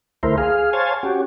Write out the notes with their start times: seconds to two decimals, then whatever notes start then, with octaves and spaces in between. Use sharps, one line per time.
0.23 D2 A3 E4 A#4 C5
0.38 G#4 F5
0.73 C5 C#5 F5 G#5 A5
1.03 C#4 F#4 G4